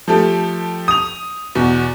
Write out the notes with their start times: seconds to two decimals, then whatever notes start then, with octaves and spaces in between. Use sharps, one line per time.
0.08 F3 A3 G4 A4
0.88 D#6 F7
1.55 E2 B2